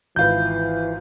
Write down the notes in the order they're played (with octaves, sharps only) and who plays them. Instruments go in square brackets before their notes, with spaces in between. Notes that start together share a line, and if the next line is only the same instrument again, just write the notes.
[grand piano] G#1 F4 B4 [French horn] E3 [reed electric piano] G6